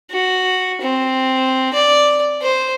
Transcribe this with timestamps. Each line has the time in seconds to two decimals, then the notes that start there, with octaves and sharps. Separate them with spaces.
0.11 F#4
0.81 C4
1.74 D5
2.42 C5